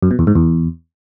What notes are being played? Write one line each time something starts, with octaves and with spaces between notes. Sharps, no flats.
F#2
B2
E2
G#2
E2